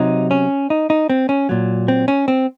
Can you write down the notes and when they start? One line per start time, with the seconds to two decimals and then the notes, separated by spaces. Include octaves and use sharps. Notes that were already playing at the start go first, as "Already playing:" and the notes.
Already playing: C3 F#3 D#4
0.31 C#4
0.70 D#4
0.90 D#4
1.10 C4
1.29 C#4
1.49 A#2 F#3
1.88 C4
2.08 C#4
2.28 C4